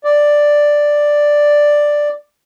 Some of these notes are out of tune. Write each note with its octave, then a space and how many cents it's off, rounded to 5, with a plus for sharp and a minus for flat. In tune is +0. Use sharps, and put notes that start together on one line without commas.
D5 +5